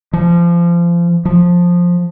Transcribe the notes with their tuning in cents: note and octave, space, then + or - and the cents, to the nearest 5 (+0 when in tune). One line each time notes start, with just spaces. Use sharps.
F3 -25
F3 +10